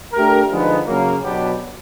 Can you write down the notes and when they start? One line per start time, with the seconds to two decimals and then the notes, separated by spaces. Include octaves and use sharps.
0.13 A3 D4 G4 A#4
0.50 D3 F3 G#3 B3 D#4
0.86 C#3 F#3 A#3
1.22 B2 F#3 B3 D4 G4